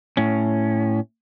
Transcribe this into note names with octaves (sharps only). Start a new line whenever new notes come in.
A2 C#4